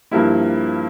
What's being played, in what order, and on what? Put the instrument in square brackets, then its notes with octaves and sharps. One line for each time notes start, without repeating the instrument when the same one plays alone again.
[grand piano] G2 F3 A#3 E4 G4